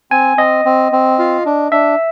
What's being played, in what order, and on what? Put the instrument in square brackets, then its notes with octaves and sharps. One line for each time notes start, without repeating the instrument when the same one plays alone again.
[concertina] C4 [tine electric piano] G#5
[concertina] C4 [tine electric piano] D#5
[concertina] C4
C4
F4
D4
[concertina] D4 [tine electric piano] E5